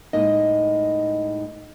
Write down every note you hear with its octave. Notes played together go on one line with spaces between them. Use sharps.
A2 G#3 A#3 D#4 D#5